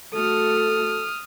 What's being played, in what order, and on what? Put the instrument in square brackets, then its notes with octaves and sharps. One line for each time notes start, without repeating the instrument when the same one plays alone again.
[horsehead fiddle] A3 F#4 [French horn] A4 [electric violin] D#6 F6